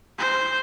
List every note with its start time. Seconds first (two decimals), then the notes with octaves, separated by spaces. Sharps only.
0.18 C5